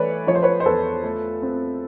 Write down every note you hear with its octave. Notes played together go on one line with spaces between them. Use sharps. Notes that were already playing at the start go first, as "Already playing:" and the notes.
Already playing: E3 A3 B4 C#5 D5
F3 C#5
C5
B4 C#5
C5
E2 A4 B4
A3
C4